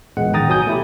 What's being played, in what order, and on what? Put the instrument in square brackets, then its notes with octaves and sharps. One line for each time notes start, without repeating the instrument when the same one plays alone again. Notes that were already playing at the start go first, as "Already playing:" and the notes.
[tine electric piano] A#1 E2 G#3 F#5
A1 D#3 G5 A#5 D#6 A6
B1 B2 F#3 G#5 D#6 G6
A3 E4 G4